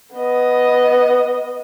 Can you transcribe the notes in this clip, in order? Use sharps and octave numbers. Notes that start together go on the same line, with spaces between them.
B3 D#5